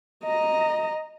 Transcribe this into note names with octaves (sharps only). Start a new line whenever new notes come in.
D#5 A#5